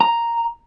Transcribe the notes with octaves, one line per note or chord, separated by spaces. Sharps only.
A#5